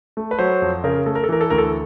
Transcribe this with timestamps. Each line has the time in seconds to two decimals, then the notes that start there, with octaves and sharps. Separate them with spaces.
0.17 A3
0.31 B4
0.39 F#3 C5
0.62 F2
0.84 C#3 A#4
1.06 A3 A4
1.15 A#4
1.24 A4
1.29 E3 A#4
1.41 A4
1.50 D2 A#4
1.58 A4